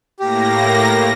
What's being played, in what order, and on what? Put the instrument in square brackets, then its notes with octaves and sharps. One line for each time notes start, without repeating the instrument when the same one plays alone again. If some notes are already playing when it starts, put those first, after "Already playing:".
[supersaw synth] A2 A#3 A#6 [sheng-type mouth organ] G4